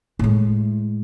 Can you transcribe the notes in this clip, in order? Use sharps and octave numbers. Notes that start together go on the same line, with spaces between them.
A2 G#3